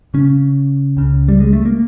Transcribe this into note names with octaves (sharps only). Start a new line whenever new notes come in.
C#3 C#4
C#2 C#3
G3
G#3
A3
A#3